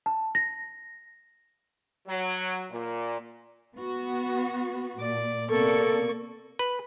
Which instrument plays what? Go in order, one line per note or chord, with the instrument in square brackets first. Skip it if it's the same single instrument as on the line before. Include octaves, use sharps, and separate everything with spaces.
[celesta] A5
A#6
[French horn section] F#3
A#2
[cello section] B3 F#4
[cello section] A#2 [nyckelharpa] D5
[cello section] C3 B3 D5 [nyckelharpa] A#3 C#6 [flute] A4
[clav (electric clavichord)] B4